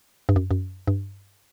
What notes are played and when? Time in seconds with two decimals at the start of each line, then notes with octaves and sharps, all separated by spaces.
0.29 G2
0.36 F#2
0.51 F#2
0.88 G2